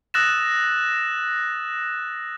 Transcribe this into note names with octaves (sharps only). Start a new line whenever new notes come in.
D#6 E6 F#6 A6 A#6 E7